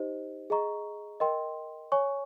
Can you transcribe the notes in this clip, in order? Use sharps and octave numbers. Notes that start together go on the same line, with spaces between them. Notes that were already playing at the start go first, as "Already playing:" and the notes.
Already playing: D#4 G4 C5 D#5
G#4 D#5 A#5 C#6
A#4 D#5 G5 C6
C#5 G#5 C#6